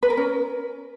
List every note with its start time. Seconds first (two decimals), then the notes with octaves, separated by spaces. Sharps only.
0.03 B4
0.10 A#4
0.17 C#4